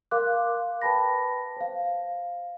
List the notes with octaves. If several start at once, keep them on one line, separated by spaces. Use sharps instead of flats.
A#4 F5 C6 D6 F#6
B4 G5 A5 B5 A#6
C5 F5